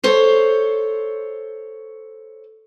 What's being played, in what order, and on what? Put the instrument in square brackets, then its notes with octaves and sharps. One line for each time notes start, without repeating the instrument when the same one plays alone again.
[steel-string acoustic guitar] A4 C5 C#5